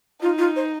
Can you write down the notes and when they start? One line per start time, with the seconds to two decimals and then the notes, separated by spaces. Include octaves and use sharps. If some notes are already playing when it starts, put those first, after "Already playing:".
0.21 D#4 F4
0.38 F4
0.56 C5